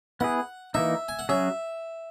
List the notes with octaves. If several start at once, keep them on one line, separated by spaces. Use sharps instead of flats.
B3 E4 G#4 F#5
E3 A#3 D#4 E5
G#5
F#5
F#3 C#4 G#4 C#5 E5